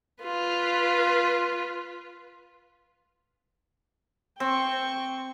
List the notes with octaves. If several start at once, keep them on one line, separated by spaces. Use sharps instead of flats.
F4 B4
C4 G5 C#6